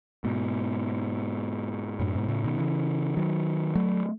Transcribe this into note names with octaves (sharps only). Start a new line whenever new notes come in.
G#2 B2
F#2 A2
G#2 B2
A2 C#3
B2 D#3
C#3 E3
D#3 F#3
F#3 A3